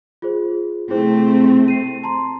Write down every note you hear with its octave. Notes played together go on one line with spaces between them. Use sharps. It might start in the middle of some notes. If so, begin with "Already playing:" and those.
F4 G#4 C5
C3 A3 C4 E4 G#4 C5
C7 D#7
A5 A#5 C6